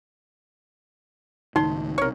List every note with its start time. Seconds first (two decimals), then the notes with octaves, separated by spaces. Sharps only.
1.56 C#2 A2 D#3 D#4 C6
1.98 B1 C3 A#4 C#5